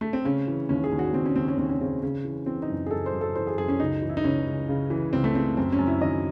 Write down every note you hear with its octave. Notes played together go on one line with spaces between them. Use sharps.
A3
C4
C#3 C#4
E3
D#2 C#4
G#4
D#2
F#4
D#2 C4
C#4
D#2 C4
C#4
D#2 C4
C#4
C#3 C4
C#3 C#4
E3
E3 C4
D#4
F#2
G#4
F#2 A4
C5
F#2
A4
E3 C5
G#4
F#2 G#4
C#4
C#2 D#4
E3
E4
D#4
C#2 C#4
C#2
C#3
E3
C#2 C4
A3
C#3 C4
F#2 C4
C#4
F#2
E4
D#3 D#5